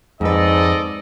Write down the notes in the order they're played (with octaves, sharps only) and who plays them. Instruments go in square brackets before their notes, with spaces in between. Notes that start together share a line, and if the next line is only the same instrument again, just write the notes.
[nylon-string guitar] F2 B4 [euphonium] G#2 [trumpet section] A4 D5 D#5